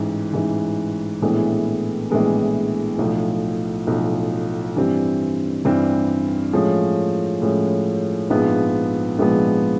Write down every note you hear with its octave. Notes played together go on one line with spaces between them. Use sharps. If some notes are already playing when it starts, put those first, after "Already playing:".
Already playing: A1 G#2 E3
A1 G#2 E3
A#1 A2 E3 G#3 B3
A#1 A2 E3 G#3 B3
B1 A2 F3
B1 A2 F3
G2 E3 G3 C4
G2 E3 G3 C4
A2 F3 G#3 C#4
A2 F3 G#3 C#4
A#1 G#2 F3 G#3 B3
A#1 G#2 F3 G#3 B3